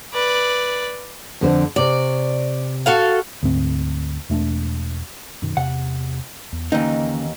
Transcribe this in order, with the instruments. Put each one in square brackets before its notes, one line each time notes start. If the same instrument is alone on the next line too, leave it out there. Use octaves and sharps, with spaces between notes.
[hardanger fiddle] B4 D5
[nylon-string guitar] F2 D3 C4
[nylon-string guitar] C3 C#5 [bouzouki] D5
[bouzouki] F#4 A4 F5
[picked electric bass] D2 G#2 C4
E1 A3 C#4 D4
[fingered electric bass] F#2 B2 D#3
[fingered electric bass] E2 C3 [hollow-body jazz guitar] F#5
[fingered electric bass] E2
[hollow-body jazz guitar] D#2 E3 D#4 [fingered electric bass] D3 A#3 C#4